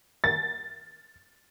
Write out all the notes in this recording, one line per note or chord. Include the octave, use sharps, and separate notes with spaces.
A6